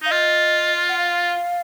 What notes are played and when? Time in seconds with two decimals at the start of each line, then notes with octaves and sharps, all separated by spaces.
0.02 D#4 F5
0.11 F4 D#5
0.89 F#5
0.98 F5